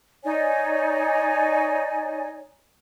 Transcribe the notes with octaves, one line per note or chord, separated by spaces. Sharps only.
D#4 C#5 D5 G#5